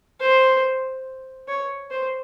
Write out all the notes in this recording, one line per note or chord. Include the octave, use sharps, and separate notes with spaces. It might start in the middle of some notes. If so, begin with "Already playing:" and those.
C5
C#5
C5